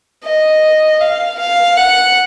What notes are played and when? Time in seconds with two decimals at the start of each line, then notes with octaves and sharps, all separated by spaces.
0.24 D#5
1.01 F5
1.39 F5
1.77 F#5